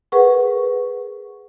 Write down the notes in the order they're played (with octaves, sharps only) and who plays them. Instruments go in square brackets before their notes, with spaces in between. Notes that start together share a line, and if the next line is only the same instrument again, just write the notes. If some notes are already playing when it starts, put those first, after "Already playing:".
[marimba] G#4 A#4 B4 F#5 C#6